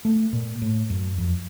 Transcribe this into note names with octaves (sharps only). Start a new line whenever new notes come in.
A3
A#2
A2
F#2
F2